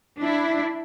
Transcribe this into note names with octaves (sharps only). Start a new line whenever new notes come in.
D4 E4